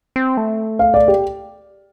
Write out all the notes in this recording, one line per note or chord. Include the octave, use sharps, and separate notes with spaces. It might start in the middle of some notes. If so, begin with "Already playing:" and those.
C4
A3
F5
D5
G4